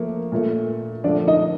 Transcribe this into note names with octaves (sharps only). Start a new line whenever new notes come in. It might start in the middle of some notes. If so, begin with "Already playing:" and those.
Already playing: F3 A3 A#3
A#2 A3
D3 F3 A3 D4 D5
D#4 D#5